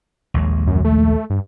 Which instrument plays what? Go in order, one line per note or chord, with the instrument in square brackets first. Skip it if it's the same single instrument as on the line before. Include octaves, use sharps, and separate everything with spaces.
[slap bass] A#1 D#2 G#3
[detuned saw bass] F#2
A3
G2